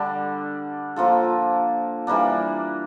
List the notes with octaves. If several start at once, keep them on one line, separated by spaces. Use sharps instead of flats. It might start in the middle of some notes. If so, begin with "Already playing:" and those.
Already playing: D3 G3 D4
F3 A#3 F4 A4
E3 G3 A#3 D4